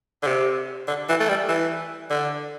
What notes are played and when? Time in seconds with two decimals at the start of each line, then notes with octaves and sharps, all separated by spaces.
0.23 D3
0.27 C3
0.87 D3
1.09 E3
1.20 A3
1.29 G3
1.49 E3
2.10 D3